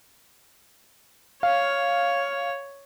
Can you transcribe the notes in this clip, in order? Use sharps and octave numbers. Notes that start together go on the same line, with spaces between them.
C#5 F5